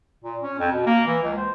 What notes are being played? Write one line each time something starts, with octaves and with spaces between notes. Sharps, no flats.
A#2
C#4
F2
B2
A#3
E3
C#2
C5